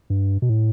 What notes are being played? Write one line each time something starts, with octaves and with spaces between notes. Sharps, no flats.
G2
B2
A2